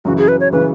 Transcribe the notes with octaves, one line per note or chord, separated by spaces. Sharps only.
F#2 C#3 E3 F#4
G#4
B4
C#5
C#3 E3 B4